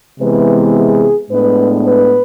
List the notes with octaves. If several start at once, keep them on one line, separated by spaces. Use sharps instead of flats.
C3 E3 G#3 B3 B4
G#4
A2 G#3 B3 D4 B4
B4